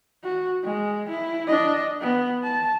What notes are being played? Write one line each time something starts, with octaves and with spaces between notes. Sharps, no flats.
F#4
G#3
E4
D4 D#5
B3
A5